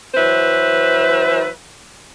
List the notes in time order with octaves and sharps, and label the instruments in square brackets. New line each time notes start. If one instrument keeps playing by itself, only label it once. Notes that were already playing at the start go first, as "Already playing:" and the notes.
[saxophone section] E3 F#3 B4 C5 E5